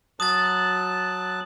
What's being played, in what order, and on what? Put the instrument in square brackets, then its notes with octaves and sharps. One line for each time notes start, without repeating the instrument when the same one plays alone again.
[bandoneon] F#3 A5 F#6 [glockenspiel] D#6 A6